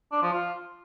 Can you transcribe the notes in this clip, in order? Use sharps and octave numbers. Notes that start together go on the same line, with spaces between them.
D4
F3
F4